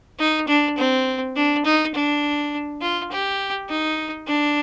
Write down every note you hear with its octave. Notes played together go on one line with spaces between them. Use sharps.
D#4
D4
C4
D4
D#4
D4
F4
G4
D#4
D4